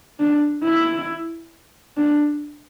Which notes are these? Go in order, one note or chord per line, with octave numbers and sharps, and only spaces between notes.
D4
E4
D4